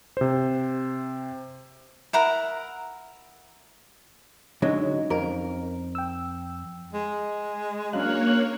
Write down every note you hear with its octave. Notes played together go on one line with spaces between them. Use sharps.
C3 C5
E4 A#4 F#5 A#5
D3 F#3 G#3 C#4 D#4
F2 A#4
G5 E6
G#3
F#3 A#3 C#4 D4 C#5 F5 F#6